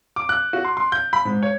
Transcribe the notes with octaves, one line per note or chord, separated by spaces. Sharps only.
D6
F#6
F#4
C6
C6
G6
B5
G#2
C#5